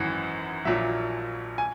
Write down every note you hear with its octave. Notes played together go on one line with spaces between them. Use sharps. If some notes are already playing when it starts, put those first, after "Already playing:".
Already playing: G#1 F#2 E3
A#1 A#2 F#3 E5
G#5